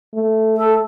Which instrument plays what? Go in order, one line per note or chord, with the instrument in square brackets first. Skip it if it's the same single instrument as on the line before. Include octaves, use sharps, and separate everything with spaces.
[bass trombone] A3
[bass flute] A4